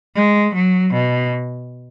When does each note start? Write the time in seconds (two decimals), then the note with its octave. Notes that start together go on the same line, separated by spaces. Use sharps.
0.15 G#3
0.54 F#3
0.93 B2